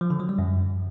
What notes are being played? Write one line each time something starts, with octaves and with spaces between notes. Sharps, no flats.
F3
D3
F#3
G3
F#2